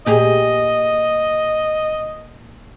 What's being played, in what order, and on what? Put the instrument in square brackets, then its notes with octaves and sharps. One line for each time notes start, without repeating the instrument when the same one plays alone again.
[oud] A#2 G4 G#4 [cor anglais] D#5